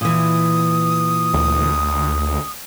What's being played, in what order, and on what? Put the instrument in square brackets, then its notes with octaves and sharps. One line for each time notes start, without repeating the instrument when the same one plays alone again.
[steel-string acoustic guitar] A#2 E3 [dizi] D#6
[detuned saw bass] D2